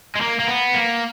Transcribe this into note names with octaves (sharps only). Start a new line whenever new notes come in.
G#3
A#3
A#3
B3
A#3